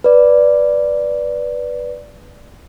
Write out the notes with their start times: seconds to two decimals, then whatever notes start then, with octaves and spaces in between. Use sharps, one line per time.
0.04 B4 D5